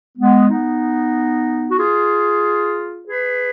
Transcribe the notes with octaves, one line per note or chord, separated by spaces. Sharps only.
G#3 B3
B3 D#4
F#4
F4 G#4
G#4 B4